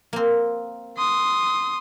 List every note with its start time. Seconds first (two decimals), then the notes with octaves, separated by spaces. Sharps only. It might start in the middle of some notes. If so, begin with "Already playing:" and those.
0.13 A#3 C4
0.97 C6 D#6